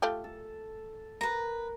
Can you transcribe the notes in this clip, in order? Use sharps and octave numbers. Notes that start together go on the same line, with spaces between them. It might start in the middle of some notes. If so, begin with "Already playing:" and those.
A3 F4 G4
A4
A#4 B4 A#5